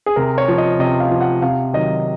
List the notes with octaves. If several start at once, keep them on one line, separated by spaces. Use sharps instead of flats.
G#4
C3 A#4
C#5
F3
D#5
C3 D#5
F5
F3
F#5
C3 F5
D#3 F#3 D#5